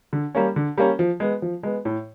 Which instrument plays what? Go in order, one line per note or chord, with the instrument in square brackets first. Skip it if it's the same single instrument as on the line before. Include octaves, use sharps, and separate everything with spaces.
[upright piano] D3
G3 A#3 C#4
D3
G3 A#3 C#4
F3
G#3 B3
F3
G#3 B3
A2